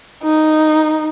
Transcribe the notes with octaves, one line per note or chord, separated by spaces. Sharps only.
D#4